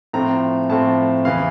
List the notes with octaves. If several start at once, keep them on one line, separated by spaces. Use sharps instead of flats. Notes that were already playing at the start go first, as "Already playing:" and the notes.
A2 F3 A3 C4 A#5
A2 F3 A3 C4 A5
E2 C#3 E3 F5